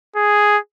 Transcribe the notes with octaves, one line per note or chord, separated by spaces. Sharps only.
G#4